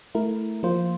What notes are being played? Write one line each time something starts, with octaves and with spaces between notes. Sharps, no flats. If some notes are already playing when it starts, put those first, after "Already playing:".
A3 E4 A#4
F3 A#3 F4 C5